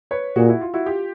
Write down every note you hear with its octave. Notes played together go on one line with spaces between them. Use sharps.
B4 C#5
A#2 F#4 G#4
E4 F#4
F4
E4 F#4
F4 G4